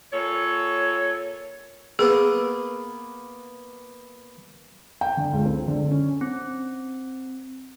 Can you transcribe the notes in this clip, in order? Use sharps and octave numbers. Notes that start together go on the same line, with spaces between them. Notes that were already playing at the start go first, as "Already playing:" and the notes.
A#2 A4 C#5
A#3 B3 G#4
G5
D3
C#2
C4
D3
C#4
C4